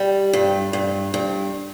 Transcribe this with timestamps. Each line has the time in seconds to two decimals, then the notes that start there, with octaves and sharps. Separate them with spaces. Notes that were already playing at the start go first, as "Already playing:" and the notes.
Already playing: G3
0.33 G2
0.73 G2
1.14 G2